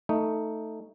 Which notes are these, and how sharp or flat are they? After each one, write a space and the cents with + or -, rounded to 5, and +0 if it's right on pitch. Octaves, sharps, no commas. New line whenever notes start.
A3 +10 D#4 +0